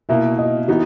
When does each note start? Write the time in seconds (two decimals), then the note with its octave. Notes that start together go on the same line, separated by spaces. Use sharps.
0.09 B2 A#3 E4 E5
0.38 D#5
0.68 E3 B3 D#4 F#4